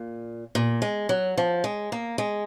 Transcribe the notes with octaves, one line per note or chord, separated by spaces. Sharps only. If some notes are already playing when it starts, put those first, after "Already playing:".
Already playing: A#2
A#2
G#3
F#3
F3
G#3
A#3
G#3